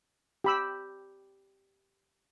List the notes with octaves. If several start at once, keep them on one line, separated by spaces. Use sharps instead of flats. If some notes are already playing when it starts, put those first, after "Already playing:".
G4 B5 E6